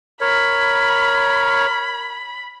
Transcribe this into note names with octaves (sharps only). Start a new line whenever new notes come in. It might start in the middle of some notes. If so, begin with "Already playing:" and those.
A#4 C#5 B5